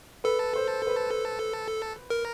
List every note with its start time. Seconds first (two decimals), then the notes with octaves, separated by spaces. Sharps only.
0.24 A4 B4
0.56 C5
0.87 B4
2.10 A#4